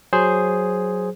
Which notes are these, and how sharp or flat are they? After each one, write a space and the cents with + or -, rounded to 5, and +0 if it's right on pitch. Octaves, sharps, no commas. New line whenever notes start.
F#3 +0 G#4 +0 C5 +0